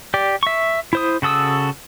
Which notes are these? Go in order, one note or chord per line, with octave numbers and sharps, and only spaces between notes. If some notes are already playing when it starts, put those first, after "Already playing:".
G4 D5
E5 C#6
E4 C5 D#6
C#3 F#4 A4 D#6 E6